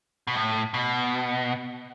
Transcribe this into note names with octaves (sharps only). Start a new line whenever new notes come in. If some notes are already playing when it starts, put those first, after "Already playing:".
B2
A2
B2